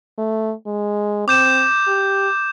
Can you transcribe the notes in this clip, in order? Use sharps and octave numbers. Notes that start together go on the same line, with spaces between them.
A3
G#3
C4 D6 G6 E7
G4